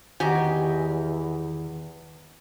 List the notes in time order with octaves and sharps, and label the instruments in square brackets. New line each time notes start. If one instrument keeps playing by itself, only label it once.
[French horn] E2 [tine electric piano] D#3 [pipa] D#4 F#4 G#5 [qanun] G4